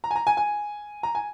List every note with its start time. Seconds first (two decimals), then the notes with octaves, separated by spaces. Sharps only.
0.04 A#5
0.11 G#5
0.16 A#5
0.27 G#5
0.37 G#5
1.03 A#5
1.15 G#5